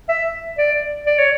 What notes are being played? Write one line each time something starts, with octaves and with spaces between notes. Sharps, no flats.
E5
D5
D5
C#5